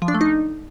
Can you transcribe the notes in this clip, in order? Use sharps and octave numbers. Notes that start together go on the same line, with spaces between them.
F3
D4
A3
D#4